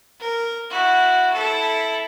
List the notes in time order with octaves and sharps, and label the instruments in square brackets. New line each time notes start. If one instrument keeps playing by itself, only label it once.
[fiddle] A#4
E4 F#4
E4 A4